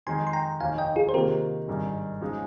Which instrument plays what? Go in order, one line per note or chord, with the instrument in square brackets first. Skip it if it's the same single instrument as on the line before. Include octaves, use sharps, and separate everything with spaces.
[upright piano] F2 D#3 G#3 [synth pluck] G#5 C6
[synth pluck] C6
G5 A#5
[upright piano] F1 D#2 D#3 [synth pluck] F5 G#5
[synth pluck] D#5 G5
F4 G#4
C5
[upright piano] C3 D#3 A#3 [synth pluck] G4 A#4
[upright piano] G#1 G2 D#3 G#3
C#3 F3 G#3 D#4